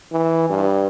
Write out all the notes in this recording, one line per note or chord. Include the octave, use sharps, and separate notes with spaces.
E3
G2